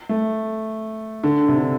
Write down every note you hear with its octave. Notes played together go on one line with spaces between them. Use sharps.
A3
D3
C3
D3